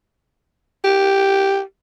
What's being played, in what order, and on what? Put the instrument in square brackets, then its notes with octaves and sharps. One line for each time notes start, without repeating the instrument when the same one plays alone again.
[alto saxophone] G4